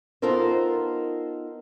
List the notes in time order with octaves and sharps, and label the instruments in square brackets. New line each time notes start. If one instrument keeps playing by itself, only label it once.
[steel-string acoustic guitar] B3 D#4 F4 A4 A#4 C5